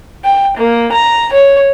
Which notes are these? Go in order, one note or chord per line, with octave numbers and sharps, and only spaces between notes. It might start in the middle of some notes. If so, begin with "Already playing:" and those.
G5
A#3
A#5
C#5